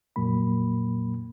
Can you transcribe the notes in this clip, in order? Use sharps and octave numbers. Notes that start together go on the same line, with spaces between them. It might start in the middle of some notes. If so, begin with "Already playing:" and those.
F2 A#2 F#3 A#3 B5